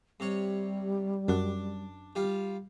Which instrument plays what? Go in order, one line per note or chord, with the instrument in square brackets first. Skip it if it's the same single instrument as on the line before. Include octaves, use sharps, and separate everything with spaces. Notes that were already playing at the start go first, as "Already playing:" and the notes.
[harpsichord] C3 C#5 [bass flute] G3
[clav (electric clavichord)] F#2 F#5 [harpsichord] D4
[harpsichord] G3 F4